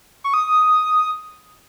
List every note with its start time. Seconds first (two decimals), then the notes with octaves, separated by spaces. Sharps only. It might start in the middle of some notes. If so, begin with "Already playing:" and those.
0.24 C#6
0.34 D#6